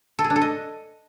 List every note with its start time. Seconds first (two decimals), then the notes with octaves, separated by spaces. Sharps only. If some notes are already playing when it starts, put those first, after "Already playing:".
0.19 A4
0.24 G#4
0.30 D4
0.36 A4
0.42 D#5